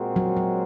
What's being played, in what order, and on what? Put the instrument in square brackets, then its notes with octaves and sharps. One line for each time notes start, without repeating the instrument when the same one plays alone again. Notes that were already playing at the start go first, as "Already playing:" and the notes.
Already playing: [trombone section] A#2 G#3 C4 F#4 A#4
[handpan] F#3
F#3